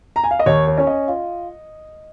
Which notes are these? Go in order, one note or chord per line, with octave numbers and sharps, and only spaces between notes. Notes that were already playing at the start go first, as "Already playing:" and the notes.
A#5
G#5
F5
D#5
D#2 C#5
C#5
C#4
D#5
F4